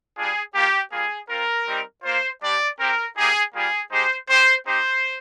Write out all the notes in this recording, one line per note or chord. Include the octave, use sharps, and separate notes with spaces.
G3 D4 F4 G#4
A#3 F4 G4
G3 A#3 F4 G#4
C4 F4 A#4
G3 C4 D#4 G4
A#3 F4 C5
G3 D4 G4 D5
C4 G4 A#4
G3 A#3 D#4 G4 G#4
G3 A#3 F4 G#4
G#3 D#4 G4 C5
C4 G4 C5
C4 D#4 G4 C5